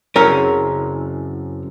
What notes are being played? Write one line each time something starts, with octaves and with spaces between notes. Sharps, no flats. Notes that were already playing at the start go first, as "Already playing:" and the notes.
F#1 F#2 C4 C#4 E4 A#4